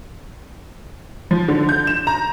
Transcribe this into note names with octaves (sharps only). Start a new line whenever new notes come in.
F3
D3
G6
E7
A#5